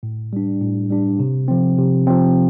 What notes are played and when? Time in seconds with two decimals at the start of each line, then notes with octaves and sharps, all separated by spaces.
0.03 A2
0.33 G3 D4
0.61 A2
0.90 G3 D4
1.19 C3
1.48 F3 C4
1.78 C3
2.07 F3 C4